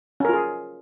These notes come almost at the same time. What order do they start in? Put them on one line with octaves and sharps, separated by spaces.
C#4 A#4 F4 G#4